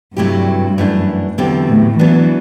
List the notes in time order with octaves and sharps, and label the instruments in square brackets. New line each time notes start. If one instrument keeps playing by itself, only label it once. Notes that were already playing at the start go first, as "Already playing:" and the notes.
[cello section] G2 [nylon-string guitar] C3 F#3 A3 E4 G4
[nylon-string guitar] F#2 E3 A3 D4
E2 D3 F#3 C4 G4
[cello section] A2
[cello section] E3 [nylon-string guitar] F#3 B3 D4